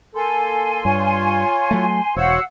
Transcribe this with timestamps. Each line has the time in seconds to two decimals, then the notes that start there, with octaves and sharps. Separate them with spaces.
0.15 A#3 A4 G#5 C6
0.85 G2 F4 C#5
1.71 F#3 A3
2.16 E1 F#4 C5 C#5 F5 F#5 E6